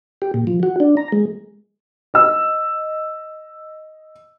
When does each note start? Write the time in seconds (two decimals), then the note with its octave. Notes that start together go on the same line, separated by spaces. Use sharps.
0.22 G4
0.34 A#2
0.47 F3
0.63 F#4
0.80 D4
0.97 A#5
1.12 G#3
2.14 D#5 E6